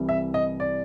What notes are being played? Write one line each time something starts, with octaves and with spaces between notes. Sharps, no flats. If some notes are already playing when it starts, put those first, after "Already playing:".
Already playing: C2 C3 E3 G3
E5
D#5
D5